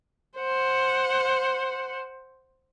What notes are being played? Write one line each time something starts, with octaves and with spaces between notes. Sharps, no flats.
C5 F#5